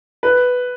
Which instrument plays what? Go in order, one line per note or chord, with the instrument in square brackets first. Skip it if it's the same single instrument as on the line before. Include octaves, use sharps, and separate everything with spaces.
[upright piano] B4